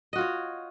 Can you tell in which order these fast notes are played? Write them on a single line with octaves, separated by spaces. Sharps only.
D#5 F#4 F4 C#5